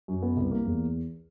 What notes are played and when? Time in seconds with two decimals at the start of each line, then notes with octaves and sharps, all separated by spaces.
0.08 F#2
0.22 B3
0.37 C2
0.51 A#3
0.66 E2